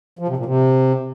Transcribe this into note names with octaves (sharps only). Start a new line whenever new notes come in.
F3
C3
A#2
C3